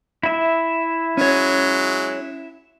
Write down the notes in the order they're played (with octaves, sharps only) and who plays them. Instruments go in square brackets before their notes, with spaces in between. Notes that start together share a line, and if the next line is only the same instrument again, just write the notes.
[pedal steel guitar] E4 E5
[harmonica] F#3 G#3 [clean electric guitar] C#4 C#5